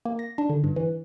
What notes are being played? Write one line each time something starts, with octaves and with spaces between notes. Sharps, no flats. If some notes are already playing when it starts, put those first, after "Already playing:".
A#3
A#6
D4
D3
G2
E3